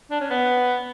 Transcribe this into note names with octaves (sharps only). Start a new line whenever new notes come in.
D4
C#4
B3